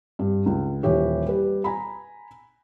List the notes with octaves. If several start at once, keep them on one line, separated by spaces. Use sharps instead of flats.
G2
C#2
D#1 E3 G4 C#5
G3 B4
G#5 A#5 B5